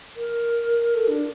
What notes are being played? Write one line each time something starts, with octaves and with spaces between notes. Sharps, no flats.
A#4
A4
D4